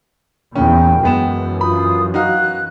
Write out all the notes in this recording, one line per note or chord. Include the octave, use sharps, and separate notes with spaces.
E2 A#2 C#4 G5
F#2 E3 G#3 B3 E7
F4 B5 D#6
D#4 F#4 F5 F#6